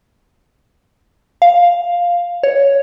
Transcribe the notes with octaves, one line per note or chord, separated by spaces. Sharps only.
F5
C#5